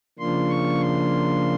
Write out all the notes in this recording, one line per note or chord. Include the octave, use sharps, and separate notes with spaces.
C#3 F3 A#3 D4 F4 C6
C#6
C6